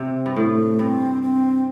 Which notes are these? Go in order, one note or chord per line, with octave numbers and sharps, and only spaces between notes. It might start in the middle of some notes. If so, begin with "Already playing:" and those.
Already playing: C3 C4
G2
A2 A3
G2 C4
C4